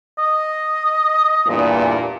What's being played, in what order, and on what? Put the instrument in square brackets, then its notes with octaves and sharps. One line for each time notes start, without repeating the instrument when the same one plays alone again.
[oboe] D#5
[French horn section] E2 G2 A#2